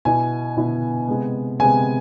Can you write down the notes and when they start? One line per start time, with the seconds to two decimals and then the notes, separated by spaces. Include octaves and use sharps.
0.05 B2 B3 E4 G#5
0.57 B2 B3 E4
1.08 C3 G#3 B3
1.60 C3 G#3 B3 G#5